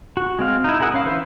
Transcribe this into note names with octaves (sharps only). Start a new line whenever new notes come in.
F#4
G#3 C4 F5
D#4 E4
E4 G#4 A#4 F#5 D#6
C#4 F5
E3 B4 C5 E5